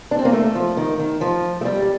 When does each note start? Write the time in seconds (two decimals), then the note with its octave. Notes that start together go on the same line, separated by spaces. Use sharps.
0.11 D4
0.19 C4
0.25 A#3
0.33 A3
0.55 F3
0.77 D#3
0.99 D#3
1.21 F3
1.61 A3
1.65 G3
1.82 G3